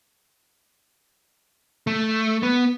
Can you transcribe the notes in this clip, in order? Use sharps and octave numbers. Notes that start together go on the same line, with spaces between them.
A3
B3